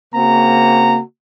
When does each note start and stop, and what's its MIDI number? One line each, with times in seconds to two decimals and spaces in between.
0.14 1.00 49
0.14 1.00 58
0.14 1.00 60
0.14 1.00 66
0.14 1.00 82